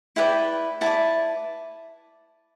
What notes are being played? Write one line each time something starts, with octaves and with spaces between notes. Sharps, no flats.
E4 B4 D5 G5
E4 B4 D5 A5